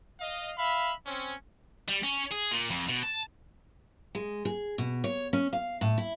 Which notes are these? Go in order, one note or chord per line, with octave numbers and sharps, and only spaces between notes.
D#5 F5
E5 F5 B5
C4 C#4
G3
C#4
G#4
A#2
F2
B2
A5
G#3
G#4
B2
C#5
C#4
F5
A2
E4